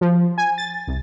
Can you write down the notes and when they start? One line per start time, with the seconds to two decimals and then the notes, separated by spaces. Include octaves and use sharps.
0.01 F3
0.38 G#5
0.58 A6
0.87 C2